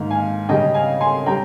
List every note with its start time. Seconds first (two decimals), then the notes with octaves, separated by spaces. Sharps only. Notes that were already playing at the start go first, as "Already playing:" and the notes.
Already playing: G#2 D#3 A#3 F5
0.10 F5 G#5
0.49 C#3 G3 C#4 D#5 G5
0.74 F5 G#5
1.01 G#5 C6
1.26 G3 C#4 G5 A#5